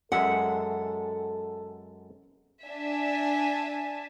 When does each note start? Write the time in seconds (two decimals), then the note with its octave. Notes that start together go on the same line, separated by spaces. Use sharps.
0.12 F#2 G#3 A4 E5 F#5
2.66 D4 E5 G#5 A5